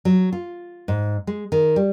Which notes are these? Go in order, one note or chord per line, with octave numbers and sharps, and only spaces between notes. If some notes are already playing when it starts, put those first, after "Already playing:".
F#3
F4
G#2
G#3
D#3
G3